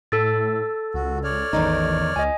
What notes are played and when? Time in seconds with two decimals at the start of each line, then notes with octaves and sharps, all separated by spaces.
0.12 A2 A4 E6 A6
0.94 C#2 F#4
1.24 C#5 D5 F6
1.53 A1 E2 D#3 D#4
2.16 C#2 D#5 G#5